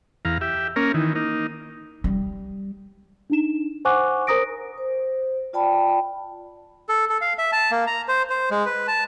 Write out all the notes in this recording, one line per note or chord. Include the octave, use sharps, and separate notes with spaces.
E2 F5 A#5
G4 E5
A#3 C#4 A#4
D#3 E3
A#3 D#4
G3
D4 D#4 E7
C5 F#5 G#5 C#6 D6 F#6
A#4 C5 A#5 D#6 A#6 D7
C5
F4 D5 G5 A5 B5
A4
A4
F5
E5
A5
A#3
A#5
C5
C5
G#3
B4
A5